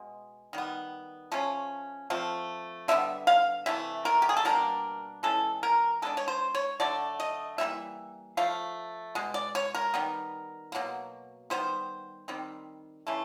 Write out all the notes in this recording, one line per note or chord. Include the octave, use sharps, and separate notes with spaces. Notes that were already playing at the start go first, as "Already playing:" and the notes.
Already playing: B2 G#3
D#3 G3 B3
F3 A3 C#4
F3 A3 C4
D3 G3 B3 E5
F5
C3 E3 A3 E5
A#4
G4
G#4
A4
B2 G3 A#3 D4 A#4
E3 G#3 C#4 A4
A#4
E3 G#3 B3 D4 A4
C#5
C5
C#5
D3 F#3 A3 D4 D5
D#5
E3 G3 A#3 E5
F3 A3 F5
B2 G#3
D5
C#5
A#4
D#3 G3 B3
B2 F#3 A#3
D#3 G3 B3 C5
D#3 G3 C4
C#3 E3 A3